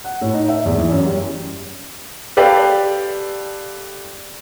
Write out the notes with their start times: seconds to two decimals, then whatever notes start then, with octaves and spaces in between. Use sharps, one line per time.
0.04 F#5
0.21 A2
0.34 D#4
0.48 E5
0.65 E2
0.78 E3
0.92 F#2
1.05 G3
2.37 G4 A4 B4 D5 F5